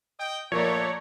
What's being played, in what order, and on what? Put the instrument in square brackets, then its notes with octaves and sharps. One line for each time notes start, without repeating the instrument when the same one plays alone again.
[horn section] D#5 G5
[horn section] A#2 A3 [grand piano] F3 A#3 [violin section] A#4 D5 A#5 [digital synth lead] C#5